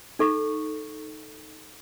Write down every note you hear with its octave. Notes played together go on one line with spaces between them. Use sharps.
D#4 A4 C#6